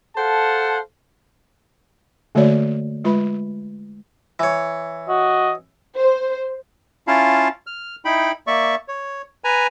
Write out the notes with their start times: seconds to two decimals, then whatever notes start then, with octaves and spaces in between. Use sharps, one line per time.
0.16 A4 C5 F5 F#5 A5
2.35 D3 A3 A#3 F#4 C#5 D5
3.04 G#3 F4 B4 E5 B5
4.40 E3 C#5
5.09 F#4 D#5
5.97 C5
7.07 C#4 E4 F4 F5 A5
7.67 F6
8.05 D#4 E4 G5 B5
8.47 A#3 D5 E5 C#6
8.88 C#5
9.44 B4 G#5 A#5